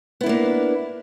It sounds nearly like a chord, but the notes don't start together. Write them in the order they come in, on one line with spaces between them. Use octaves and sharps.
B3 E4 D4 A#3